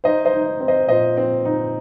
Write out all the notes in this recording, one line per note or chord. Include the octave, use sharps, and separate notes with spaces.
D#4 C5 D#5
C5 D#5
D#4
C4
C5 D#5
A#2 C5 D#5
C4
D#4